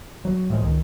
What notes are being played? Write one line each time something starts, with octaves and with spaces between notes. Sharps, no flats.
F#3
A2 F3 G#3
C#2 D#3